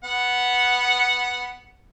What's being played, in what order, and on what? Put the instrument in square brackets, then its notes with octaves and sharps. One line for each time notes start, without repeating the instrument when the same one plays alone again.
[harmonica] B3 F#5